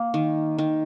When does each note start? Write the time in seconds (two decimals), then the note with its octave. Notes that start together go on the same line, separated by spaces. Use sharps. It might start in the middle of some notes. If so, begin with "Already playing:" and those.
Already playing: A#3
0.14 D#3
0.58 D#3